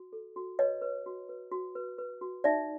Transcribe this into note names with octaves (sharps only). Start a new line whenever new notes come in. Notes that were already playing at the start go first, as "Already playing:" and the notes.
Already playing: F#4
A4
F#4
B4 C#5 D#5
B4
F#4
B4
F#4
B4
B4
F#4
D#4 D5 E5